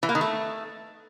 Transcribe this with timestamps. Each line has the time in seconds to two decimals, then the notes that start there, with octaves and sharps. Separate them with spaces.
0.03 E3
0.09 A#3
0.15 D#3
0.21 A3